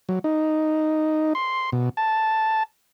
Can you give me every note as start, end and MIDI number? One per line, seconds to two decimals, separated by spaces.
0.09 0.19 54
0.24 1.33 63
1.35 1.70 84
1.72 1.89 47
1.97 2.63 81